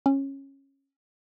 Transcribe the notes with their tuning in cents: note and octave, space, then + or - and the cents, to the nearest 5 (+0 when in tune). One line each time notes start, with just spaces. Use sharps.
C#4 -15